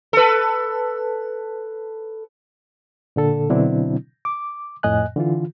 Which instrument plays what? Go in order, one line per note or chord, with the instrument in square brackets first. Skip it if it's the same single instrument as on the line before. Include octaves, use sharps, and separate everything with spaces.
[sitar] A4 B4
[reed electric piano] A#2 D3 A4
B2 D3 F#3 C4 D4 E4
D6
F2 A2 D#5 G#5 F#6
D3 E3 F4